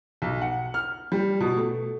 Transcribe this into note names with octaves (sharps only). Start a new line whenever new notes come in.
B1
F#5
F6
G3
B2
A3